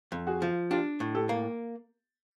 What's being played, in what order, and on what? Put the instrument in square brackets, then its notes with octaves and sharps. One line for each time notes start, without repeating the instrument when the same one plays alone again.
[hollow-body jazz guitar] F2
[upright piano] F#4 G#4
[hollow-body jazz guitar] F3
[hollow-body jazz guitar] D4 [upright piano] F4 G4
[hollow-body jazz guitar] A2
[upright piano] G4 A4
[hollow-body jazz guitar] A#3